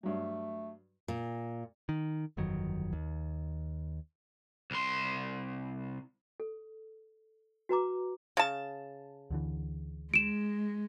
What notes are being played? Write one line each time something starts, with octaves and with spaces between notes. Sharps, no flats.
G2 F#3 A3
A#2
D#3
G1 F2 D#3 F#3
D#2
C2 C6
A4
F#4 B4 A#5 D6
C#3 A5
D2 D3 E3
G#3 D7 E7